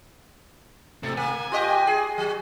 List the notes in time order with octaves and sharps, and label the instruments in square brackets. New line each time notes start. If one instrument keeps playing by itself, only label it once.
[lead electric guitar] A2 C3 [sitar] A4
[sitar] A#3 [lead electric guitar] G#5
[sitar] F4 G4 D#5
G#4
F#3